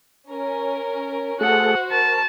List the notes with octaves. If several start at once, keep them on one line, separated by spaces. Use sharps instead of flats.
C#4 A#4
A3 F#4 G#4 A4 C5 F#5
A#4 A5